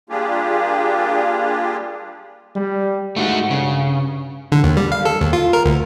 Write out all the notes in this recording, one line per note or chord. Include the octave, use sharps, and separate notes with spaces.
G3 A#3 D4 F4 G4 G#4
G3
G#2 A3 F4 F#4
G2 C#3
D3
D#2
G3
F5
A4
D#2
F4
A#4
D2